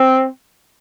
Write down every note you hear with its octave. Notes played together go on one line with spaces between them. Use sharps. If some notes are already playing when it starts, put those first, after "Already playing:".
Already playing: C4